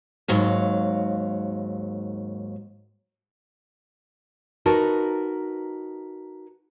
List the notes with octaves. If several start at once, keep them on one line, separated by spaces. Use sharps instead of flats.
D#2 G#2 F#3 F5
D#4 F#4 A#4 B4 A5